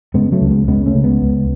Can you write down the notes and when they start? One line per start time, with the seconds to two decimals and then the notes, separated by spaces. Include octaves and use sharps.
0.14 C#3 G#3 B3
0.32 F#3 A3
0.41 C#2
0.50 G#3 B3
0.68 C#3 G#3 B3
0.86 A3 C#4
0.95 C#3
1.04 G#3 B3
1.22 C#2